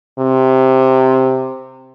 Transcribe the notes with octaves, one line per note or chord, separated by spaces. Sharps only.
C3